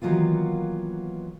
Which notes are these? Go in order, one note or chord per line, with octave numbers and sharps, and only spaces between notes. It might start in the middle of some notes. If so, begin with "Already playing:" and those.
D#3 E3 F#3 A#3 B3 F4